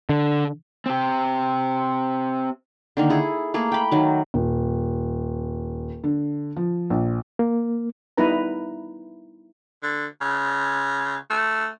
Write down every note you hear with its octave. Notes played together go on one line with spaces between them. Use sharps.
D3
C4 G4
D3 D#3 A#3
E4 G#4 A4
A3 A#3 G#4
G5 B5
D#3 F#3
D#1
D3
F3
A#1
A#3
G3 B3 D#4 E4 B4 A#5
D3
C#3
A3